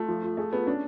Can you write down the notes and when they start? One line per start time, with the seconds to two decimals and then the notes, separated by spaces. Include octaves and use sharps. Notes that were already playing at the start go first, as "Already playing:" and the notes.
Already playing: A3 F4
0.08 F3
0.23 F4
0.37 A3 G#4
0.53 B3 G#4
0.67 C#4 D4